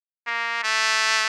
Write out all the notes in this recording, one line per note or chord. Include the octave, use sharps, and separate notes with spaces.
A#3
A3